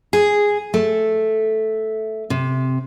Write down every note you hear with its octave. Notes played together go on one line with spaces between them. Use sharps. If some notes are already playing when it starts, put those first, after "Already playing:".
G#4
A3
C3